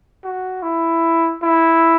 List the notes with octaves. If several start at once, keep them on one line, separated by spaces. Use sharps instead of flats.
F#4
E4
E4